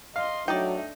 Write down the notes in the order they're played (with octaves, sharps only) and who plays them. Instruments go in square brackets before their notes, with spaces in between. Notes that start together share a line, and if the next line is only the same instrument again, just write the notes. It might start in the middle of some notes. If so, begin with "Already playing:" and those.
[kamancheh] D#5 C6 [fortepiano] F5
[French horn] F#3 [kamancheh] A3 D4 [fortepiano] D#4 [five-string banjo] D5 G5